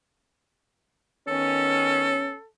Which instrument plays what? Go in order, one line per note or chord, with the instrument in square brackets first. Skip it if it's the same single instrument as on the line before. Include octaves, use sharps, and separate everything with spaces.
[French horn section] D#3 B3 C#4 [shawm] A4